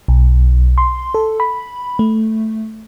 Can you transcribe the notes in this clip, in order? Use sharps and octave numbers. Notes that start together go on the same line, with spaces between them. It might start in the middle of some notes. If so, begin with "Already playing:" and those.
B1
C6
A4
B5
A3